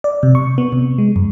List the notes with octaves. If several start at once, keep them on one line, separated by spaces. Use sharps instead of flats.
D5
C3
C#6
B3
C3
G#3
F#2